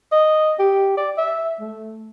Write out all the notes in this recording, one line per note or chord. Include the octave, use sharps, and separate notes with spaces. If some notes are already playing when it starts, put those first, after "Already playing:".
D#5
G4
D5
E5
A3